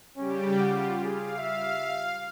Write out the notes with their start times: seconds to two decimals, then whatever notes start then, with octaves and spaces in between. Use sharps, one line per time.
0.17 C#3 G3 C#4 G4
0.60 F4 F#5
1.04 G#4 F5
1.37 E5